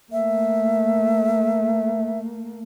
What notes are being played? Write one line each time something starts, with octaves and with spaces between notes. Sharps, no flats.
A3 A#3 E5